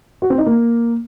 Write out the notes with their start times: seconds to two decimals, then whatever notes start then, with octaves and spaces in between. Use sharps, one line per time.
0.22 F#4
0.30 C4
0.38 D#4
0.46 A#3